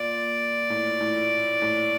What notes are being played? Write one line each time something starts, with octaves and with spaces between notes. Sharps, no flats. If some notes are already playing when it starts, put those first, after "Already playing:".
Already playing: A#2 D5
A2
A2
A2